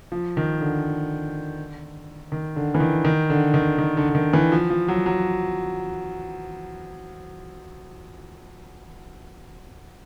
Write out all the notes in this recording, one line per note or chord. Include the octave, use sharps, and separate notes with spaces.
F3
D#3
D3
D#3
D3
E3
D#3
D#3
D3
D#3
D#3
D3
D3
D#3
E3
F3
F3
F#3
F#3